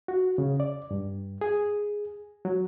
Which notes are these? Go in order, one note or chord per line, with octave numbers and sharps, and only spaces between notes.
F#4
C#3
D5
G2
G#4
F#3